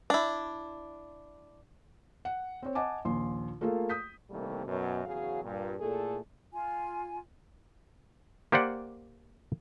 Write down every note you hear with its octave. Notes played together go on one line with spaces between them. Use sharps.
D4 E4
F#5
C4 C5 C#5
D#5 F#5 G#5 A5 D6
A#1 D#2 C6
A3 A#3 F4 G#4 A4
D#6 G6 B6
C3 D#3 E3 G3 A3 A#3
F#2 B2
E2 C#3 F#3 F#4 G#4 F5
G2 A#2
A#2 A3 E4 G#4 A4
F4 G#5
A#3 G4 C5 D5 F#5